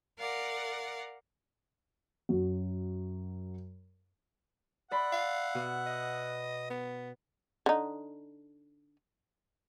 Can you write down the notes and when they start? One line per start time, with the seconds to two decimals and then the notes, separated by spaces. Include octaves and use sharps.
0.18 A#4 D5 F5 F#5
2.29 F#2 F#3
4.91 D5 E5 F#5 B5 C6
5.12 F5
5.55 B2
5.86 D#5
6.70 B3
7.66 D3 D#4